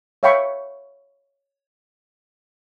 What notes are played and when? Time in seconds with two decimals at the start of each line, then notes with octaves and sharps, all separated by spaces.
0.23 C#5 E5 F5 G5 B5 C#6